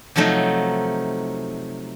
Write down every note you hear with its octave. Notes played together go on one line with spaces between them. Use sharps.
C3 F3 F#3 A3 D#4